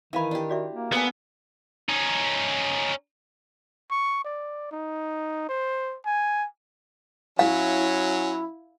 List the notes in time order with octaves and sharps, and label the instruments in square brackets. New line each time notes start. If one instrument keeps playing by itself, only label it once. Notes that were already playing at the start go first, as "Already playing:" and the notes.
[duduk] D#3 [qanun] E3 G#5 [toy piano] E5 F5 B5
[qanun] D4 G4
[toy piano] F#4 D5 E5
[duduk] A#3
[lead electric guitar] B3 [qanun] A4 D5 E5 [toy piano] B4 G#5
[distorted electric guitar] C#4 D#4
[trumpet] C#6
D5
D#4
C5
G#5
[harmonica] F#3 C#4 [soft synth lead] E4 [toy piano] F5